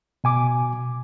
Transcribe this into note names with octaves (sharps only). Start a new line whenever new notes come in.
B2 G#5 D6